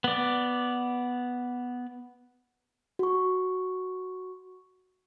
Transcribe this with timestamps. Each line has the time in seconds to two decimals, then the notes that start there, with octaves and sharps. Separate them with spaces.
0.04 B3 D5
2.99 F#4 C#6